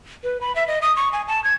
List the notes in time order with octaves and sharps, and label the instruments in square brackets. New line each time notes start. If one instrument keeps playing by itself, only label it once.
[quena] B4
B5
E5
D#5
D#6
C#6
G#5
A5
G#6